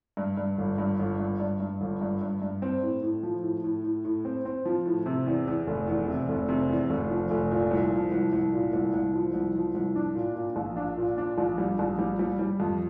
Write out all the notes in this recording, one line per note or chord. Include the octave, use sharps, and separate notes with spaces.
G2
G2
G1
G2
G1
G2
G2
G2
G1
G2
G2
G2
C4
A2
A2
F3
A2
A2
A2
A2
C4
C4
F3
A2
C3
E2
E2
F1
E2
C3
F1
C3
E2
F1
F3
F1
A#2
C2
F3
C2
C2
A#2
C2
C2
F3
C2
F3
C2
D4
A#2
A#2
A#1
D4
A#2
D4
A#1
G3
A#1
G3
G3
G3
F2